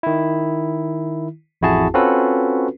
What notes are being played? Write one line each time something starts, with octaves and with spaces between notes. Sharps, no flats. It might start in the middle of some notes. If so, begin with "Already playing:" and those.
D#3 E4
A1 F2 E4 F#4 G#4 A5
C4 C#4 F4 F#4 A4 B4